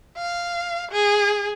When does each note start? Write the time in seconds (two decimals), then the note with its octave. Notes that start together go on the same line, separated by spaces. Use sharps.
0.17 F5
0.91 G#4